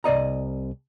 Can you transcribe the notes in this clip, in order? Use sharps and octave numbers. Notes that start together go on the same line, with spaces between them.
C2 D5 D#5 A#5